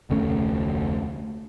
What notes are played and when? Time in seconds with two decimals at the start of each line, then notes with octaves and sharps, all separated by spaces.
0.10 F1 D2 A3 C#4